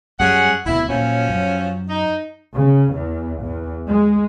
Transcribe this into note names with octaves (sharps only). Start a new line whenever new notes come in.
F#2 G3 C#4 G#4 F#5
D1 B2 E4
A#2 F3 F#3 C#4
F#2
D#4
C#3
E2
E2
G#3